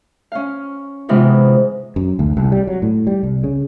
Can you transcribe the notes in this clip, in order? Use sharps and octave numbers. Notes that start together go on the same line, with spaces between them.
C#4 F5
G#2 C3 E3 G#3 B3 F4
F#2
D2
C2
G3
F#3
A2
G3
C2
C#3